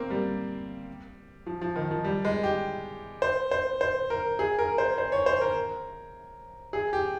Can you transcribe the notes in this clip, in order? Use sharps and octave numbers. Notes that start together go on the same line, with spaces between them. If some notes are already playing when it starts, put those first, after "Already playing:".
Already playing: A#3 C4
G3
F3
F3
D#3
F3
G3
G#3
G4
C5
C5
C5
A#4
G#4
A#4
C5
C5
C#5
C5
A#4
G#4
G4